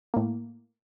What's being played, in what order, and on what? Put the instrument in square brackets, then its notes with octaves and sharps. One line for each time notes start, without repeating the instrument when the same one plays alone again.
[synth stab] A2 A#3